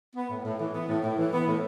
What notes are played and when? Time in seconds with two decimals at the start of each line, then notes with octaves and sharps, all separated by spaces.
0.15 B3
0.30 A2
0.45 A2
0.59 E3
0.74 B3
0.89 A2
1.04 A2
1.17 E3
1.33 B3
1.47 A2